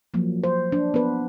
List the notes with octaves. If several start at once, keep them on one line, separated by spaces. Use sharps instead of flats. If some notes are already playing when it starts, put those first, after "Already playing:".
F3 F#3 A#3
C5
D4
B3 B4